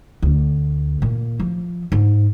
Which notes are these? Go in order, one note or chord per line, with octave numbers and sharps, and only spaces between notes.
D2
A#2
F3
G#2